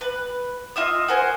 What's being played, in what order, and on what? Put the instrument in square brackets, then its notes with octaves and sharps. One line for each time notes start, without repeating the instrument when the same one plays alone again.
[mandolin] B4
F4 D#5 E5 D#6
F#4 A#4 C5 G#5